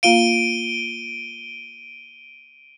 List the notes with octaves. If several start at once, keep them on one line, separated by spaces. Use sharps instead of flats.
A#3 F4 F5 D7 D#7 G7